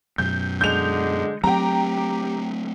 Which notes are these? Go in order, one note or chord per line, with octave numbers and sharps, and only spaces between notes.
F#2 B2 G6
D3 G#3 G6 F7
F#3 A3 C4 G4 G5 A#5